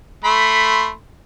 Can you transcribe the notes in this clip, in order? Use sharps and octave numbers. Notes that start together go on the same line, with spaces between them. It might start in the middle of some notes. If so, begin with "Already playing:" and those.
A3 B5 C6